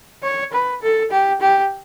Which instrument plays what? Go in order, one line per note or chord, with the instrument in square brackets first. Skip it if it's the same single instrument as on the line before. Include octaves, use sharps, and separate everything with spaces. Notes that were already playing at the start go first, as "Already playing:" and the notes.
[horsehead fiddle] C#5
B4
A4
G4
G4